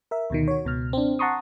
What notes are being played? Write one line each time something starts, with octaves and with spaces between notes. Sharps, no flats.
A#4 E5
D2 B2 D#3
F#4 C#5
C#2 B2 F6
C4 D4
F#5 A5 A#5 C6 C#6 D#6